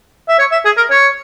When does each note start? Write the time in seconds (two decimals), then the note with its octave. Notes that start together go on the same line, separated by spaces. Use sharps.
0.29 E5
0.39 C#5
0.52 E5
0.65 G#4
0.77 A#4
0.91 C#5